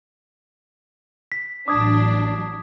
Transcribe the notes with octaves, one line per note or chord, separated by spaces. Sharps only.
B6
A1 F#3 D4 D6 D#6 G#6